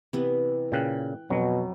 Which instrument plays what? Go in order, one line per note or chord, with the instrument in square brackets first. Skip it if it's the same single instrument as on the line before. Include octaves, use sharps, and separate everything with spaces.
[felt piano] C3 [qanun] E3 B3
[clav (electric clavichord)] A#2 C#3 [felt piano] G5 F#6
[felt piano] F2 [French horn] B2 [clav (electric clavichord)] F#3